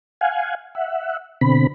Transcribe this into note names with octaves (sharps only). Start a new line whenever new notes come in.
F5 F#5 G#5
E5 F#5
B2 D3 C4 B5